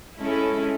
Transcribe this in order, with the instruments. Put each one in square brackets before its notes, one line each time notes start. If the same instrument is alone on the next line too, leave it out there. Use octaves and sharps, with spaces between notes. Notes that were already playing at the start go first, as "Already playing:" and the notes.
[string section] G#3 C#4 E4 A4